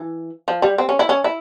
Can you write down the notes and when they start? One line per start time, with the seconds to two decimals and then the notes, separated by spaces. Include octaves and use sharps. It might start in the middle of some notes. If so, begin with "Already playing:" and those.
Already playing: E3
0.48 F3
0.62 G3
0.78 C4
0.89 C#4
0.99 E4
1.09 C#4
1.24 E4